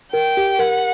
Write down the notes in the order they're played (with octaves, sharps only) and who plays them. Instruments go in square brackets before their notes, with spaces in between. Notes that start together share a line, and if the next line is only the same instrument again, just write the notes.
[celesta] A#4 [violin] G5
[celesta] G4
[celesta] A#4 [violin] F#5